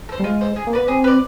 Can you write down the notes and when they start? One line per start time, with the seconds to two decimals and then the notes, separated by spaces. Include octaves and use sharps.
0.09 A4 C5
0.19 G3
0.24 G#3 F4
0.41 A4 C5
0.56 G#4
0.67 A#3
0.73 B3 B4 D5
0.88 C4 G#4
1.04 B4 D5